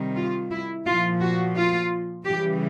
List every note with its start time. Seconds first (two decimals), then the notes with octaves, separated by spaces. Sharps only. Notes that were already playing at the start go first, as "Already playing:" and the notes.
Already playing: C3 D#3 G3
0.16 F4
0.51 E4
0.86 A#2 F3 F4
1.21 F#4
1.56 F4
2.25 C#3 E3 G3 G4